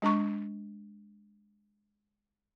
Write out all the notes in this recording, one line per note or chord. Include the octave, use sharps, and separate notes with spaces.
G#3 D4 A#5 C#6